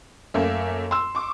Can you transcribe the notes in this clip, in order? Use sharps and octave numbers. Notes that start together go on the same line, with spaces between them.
F#2 A3 A#3 E5
C6 E6
C#6 D6